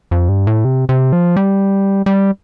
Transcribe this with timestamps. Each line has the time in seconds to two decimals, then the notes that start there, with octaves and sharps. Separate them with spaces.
0.11 F2
0.29 G2
0.47 A2
0.65 C3
0.89 C3
1.13 F3
1.36 G3
2.06 G3